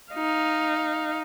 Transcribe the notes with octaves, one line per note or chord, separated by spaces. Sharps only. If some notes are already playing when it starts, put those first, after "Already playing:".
D#4 F5